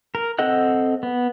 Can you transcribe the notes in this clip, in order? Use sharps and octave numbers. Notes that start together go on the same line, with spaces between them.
A#4
C4 A4 D#5 F#5 F#6
B3